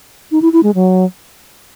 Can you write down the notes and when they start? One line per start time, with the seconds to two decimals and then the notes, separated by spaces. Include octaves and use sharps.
0.31 D#4
0.42 E4
0.53 E4
0.63 G#3
0.75 F#3